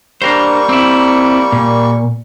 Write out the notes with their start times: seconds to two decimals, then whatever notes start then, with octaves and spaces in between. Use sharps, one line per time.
0.22 G3 A#3 D4 A#4 C5 C#6
0.69 C4 E4
1.52 A#2